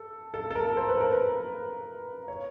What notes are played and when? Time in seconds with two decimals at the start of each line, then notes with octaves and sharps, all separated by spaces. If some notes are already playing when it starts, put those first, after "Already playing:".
Already playing: A4
0.34 A4
0.50 A4
0.55 A#4
0.77 C5
0.89 B4
1.00 A#4
1.13 B4
2.28 C#5